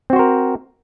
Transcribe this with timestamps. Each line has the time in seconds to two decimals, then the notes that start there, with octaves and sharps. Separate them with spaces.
0.10 C4
0.13 F#4
0.16 C5
0.19 A#4